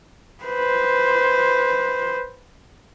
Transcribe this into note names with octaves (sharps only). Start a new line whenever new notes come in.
B4 C5